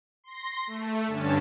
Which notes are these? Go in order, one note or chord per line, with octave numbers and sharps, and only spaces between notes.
C6 A#6
A3
G2 D3 C#4 A5